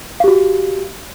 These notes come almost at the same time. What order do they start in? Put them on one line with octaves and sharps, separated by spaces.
F5 G4 F#4